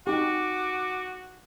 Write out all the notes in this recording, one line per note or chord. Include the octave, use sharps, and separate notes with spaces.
D#4 F#4 G4 D6